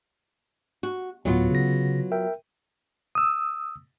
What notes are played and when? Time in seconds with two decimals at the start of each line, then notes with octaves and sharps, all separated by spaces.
0.83 F#4
1.25 D2 A2 F#3 B3 F4
1.50 C#3 A#6
2.12 A#4 E5 G5
3.15 D#6 E6